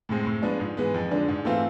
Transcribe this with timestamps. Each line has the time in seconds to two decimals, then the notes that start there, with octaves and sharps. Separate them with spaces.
0.09 A2 G#3 C4
0.26 A2
0.42 F3 G#3 B3 D4
0.60 G#2
0.77 E3 G#3 B3
0.94 F2
1.11 D3 G#3 D4
1.28 G#2
1.45 E3 A3 C4 F4